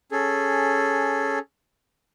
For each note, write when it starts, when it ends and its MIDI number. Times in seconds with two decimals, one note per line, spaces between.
0.12 1.39 61
0.12 1.39 68
0.12 1.39 69